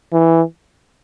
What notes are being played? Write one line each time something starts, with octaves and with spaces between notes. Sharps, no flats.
E3